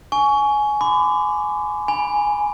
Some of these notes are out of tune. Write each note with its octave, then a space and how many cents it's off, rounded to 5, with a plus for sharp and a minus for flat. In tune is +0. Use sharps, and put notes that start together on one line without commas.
G#5 +15 C#6 +20
B5 +45 D6 +0
G#5 +0 B5 -20